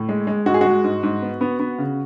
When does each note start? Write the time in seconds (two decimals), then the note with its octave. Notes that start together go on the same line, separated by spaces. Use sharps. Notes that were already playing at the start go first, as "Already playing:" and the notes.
Already playing: A2
0.09 G#3
0.27 G#3
0.46 G#2 F#4
0.54 G#4
0.61 G#3 F#4
0.84 G#2
1.03 G#2
1.22 B3
1.41 B3
1.60 B3
1.78 C#3